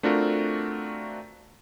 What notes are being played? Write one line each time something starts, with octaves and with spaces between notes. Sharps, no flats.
A3 C4 D4 F4 F#4 A#4